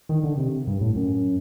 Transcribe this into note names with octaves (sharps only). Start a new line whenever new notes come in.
D#3
D3
C3
G2
A2
F#2